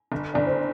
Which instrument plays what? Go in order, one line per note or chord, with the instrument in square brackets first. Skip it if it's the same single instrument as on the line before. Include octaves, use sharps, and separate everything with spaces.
[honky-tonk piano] G1
[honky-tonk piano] G1 [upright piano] D5
[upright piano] C5